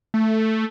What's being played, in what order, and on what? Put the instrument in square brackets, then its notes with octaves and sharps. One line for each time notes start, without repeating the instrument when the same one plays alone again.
[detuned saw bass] A3